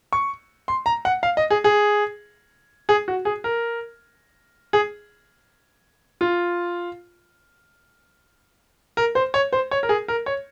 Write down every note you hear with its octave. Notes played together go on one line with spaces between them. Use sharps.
C#6
C6
A#5
F#5
F5
D#5
G#4
G#4
G#4
F#4
G#4
A#4
G#4
F4
A#4
C5
C#5
C5
C#5
A#4
G#4
A#4
C#5